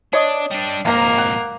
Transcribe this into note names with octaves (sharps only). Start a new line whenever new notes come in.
D4 C#5 D#5
G3 D4
F2 G#2 D#3 A#3 A#4 A#5
F#5